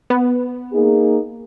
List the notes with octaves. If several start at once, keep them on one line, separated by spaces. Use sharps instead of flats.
B3
A#3 D#4 G#4